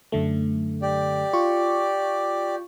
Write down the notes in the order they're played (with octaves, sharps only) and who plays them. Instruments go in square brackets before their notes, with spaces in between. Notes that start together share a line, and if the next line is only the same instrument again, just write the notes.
[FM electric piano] F#2 D3 A3
[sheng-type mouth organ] G4 D5
[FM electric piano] F4 C#6